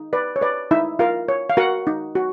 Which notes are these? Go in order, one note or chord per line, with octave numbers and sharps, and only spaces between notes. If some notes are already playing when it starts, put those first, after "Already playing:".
Already playing: D#4
B4 D5
C#5
B4 D5
D#4 E4 E5
F4 A#4 F5
C#5
F5
F#4 A#4 F#5
D#4
F#4